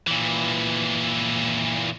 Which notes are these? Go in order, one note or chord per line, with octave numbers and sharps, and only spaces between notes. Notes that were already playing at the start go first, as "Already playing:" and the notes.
A#2 E3